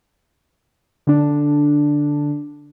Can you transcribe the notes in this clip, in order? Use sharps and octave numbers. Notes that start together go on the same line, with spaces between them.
D3 D4